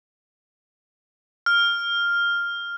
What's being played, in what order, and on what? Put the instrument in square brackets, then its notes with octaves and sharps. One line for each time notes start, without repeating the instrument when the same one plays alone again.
[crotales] F6